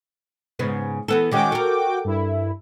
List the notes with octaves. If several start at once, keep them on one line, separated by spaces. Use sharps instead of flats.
G#2 C#3 B3
E3 B3 A4
D#3 G#3 C#4 F#4 G5 D6
A4 A#4
G2 E4